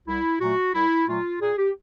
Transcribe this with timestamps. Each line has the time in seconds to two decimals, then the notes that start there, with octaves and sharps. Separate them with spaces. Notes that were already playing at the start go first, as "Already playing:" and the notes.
0.07 C2 E4
0.41 A#2 F#3 A3 F#4
0.74 C2 E4
1.08 A#2 F#3 A3 F4
1.40 A#2 G#4
1.58 G4